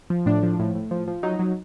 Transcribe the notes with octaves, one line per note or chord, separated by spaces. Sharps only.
F3
A2 D4
F3
A2
A2
F3
F3
F#3 D#4
F#3